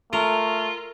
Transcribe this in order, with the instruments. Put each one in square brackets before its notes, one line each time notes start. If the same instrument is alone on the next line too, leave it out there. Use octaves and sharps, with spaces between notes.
[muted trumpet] A3 [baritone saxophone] F4 [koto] A#4